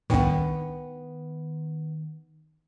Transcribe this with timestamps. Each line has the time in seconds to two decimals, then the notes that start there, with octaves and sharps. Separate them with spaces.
0.10 C2 A2 D#3 B3 D4 G5 C#6